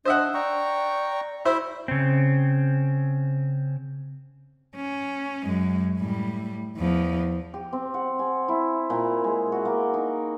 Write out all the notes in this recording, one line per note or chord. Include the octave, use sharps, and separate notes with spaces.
D4 C5 D#5 E5 F#5
D5 G5 A#5 C#6
E4 C5 E5 B5
C#3 C4
C#4
F#2 G#3
A2 G3
E2 F3
G4
C4
F#5
G#5
E4
A#2
G#3
F#4
A#3
D#4